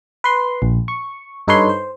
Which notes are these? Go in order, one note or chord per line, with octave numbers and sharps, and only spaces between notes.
B4 C6
A#1
C#6
G2 D#4 A4 B4 C#5 C6
C5